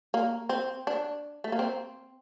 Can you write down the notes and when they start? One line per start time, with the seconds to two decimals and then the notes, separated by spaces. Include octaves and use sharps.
0.14 A#3
0.49 C4
0.87 D4
1.44 A3
1.52 A#3
1.59 C4